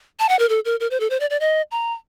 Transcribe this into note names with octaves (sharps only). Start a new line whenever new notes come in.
A5
F#5
A#4
A4
A#4
A#4
C5
A4
C5
D5
D5
D#5
A#5